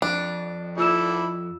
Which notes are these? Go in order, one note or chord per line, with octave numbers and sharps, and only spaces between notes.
F2 D4
E4 F4 A4 D5 E6 E7